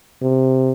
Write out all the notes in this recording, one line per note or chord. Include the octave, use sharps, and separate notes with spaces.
C3